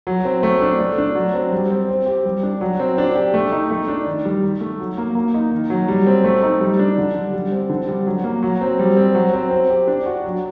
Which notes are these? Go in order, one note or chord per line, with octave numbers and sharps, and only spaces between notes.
F#3
C4
A3
D4
A3
D4
F#3
C4
G3
C4
C4
G4
G3
D4
F#3
C4
D4
G4
A3
D#4
A3
D4
D#3
G3
D#3
A3
F#3
A#3
A#3
D#4
D#3
F#3
G3
C4
A3
D#4
G3
D4
D3
G3
G3
C4
D3
G3
F#3
A#3
F#3
C4
G3
C4
F#3
C4
C4
G4
D4
F#4
F#3